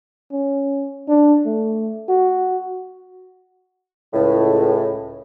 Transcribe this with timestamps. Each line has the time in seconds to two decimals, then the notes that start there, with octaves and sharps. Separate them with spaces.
0.32 C#4
1.09 D4
1.46 A3
2.09 F#4
4.14 C#2 A2